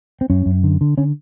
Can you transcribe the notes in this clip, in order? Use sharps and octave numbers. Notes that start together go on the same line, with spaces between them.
C4
F#2 C#4
F#2
D3
D3
D3 C#4